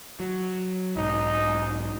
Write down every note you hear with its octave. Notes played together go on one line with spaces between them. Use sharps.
F#3
B1 G#2 D#4